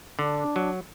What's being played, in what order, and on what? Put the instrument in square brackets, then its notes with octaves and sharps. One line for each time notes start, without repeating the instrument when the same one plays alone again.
[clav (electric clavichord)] D3 [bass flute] D4
[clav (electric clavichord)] F#3